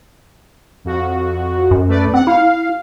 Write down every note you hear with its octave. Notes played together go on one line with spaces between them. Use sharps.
F2 F#4
F#2
A3 B4 D5
C4 F#5
E4 F5